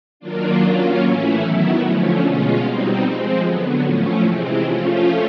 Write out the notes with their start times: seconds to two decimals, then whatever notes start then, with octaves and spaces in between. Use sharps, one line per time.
0.20 D#3 F#3 A#3 D4 F4
0.61 F#3 A#3 C#4 F4
1.00 A2 E3 A3 C#4 E4
1.41 D#3 F#3 B3 E4
1.80 D3 F3 A3 C#4
2.21 B2 G#3 C#4 F4
2.60 B2 G3 C4 D#4
3.00 F3 G#3 C4
3.41 D3 F#3 B3
3.81 A2 F3 A3 C#4
4.21 C3 E3 G#3 C4
4.61 F3 A3 C#4 F4